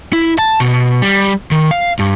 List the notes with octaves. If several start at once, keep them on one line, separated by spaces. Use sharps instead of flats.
E4
A5
B2
G3
D#3
F5
G2